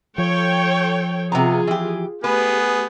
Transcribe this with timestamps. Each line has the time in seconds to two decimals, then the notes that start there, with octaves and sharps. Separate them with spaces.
0.18 F3 A4 C#5 G5
1.32 C3 B3 F4 G#4 A#5
1.67 E3 G4
2.24 A3 B3 G4 G#4 B4